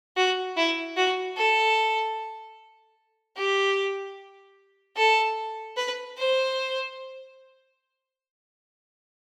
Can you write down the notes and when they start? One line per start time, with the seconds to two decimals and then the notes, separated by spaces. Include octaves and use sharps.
0.17 F#4
0.57 E4
0.96 F#4
1.37 A4
3.36 G4
4.97 A4
5.77 B4
6.18 C5